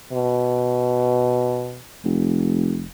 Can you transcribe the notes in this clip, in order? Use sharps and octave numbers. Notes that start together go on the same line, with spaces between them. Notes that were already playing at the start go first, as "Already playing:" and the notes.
B2
F1